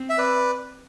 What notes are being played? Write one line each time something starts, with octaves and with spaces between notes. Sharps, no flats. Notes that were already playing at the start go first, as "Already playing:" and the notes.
Already playing: C4
E5
B4 D5